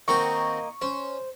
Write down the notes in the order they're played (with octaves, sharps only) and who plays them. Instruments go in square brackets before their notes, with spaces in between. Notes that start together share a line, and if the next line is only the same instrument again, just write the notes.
[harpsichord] D#3 C4 F#4 [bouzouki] A#3 D#4 [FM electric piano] C#6
[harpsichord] C#4 [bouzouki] C5